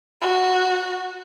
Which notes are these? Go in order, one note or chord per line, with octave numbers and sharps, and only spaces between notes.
F#4